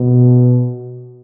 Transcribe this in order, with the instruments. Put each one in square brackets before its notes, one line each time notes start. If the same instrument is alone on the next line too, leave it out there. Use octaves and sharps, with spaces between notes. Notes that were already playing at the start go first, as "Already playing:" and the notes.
Already playing: [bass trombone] B2